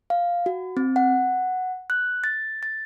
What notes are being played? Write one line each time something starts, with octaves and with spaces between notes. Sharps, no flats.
F5
F#4
C4
F#5
F#6
A6
A6